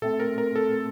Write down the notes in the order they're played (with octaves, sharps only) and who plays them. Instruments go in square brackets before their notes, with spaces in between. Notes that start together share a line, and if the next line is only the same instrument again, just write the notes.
[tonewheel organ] A#2 A3 C4 [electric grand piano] A4
[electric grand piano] A#4
A#4
A4